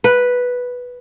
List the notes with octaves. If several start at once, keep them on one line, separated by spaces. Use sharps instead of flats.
B4